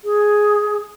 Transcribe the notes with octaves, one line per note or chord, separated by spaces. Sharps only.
G#4